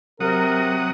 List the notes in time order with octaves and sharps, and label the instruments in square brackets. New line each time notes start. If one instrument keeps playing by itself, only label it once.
[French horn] C3 [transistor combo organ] F#3 F#5 D#6 [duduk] A#4